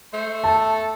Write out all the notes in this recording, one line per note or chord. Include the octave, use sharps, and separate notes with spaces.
A3 C5
A4 A5